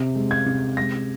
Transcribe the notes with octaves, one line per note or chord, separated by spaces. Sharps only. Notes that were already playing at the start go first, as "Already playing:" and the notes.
Already playing: C3
G#3
G#6
C3
G#3 A#6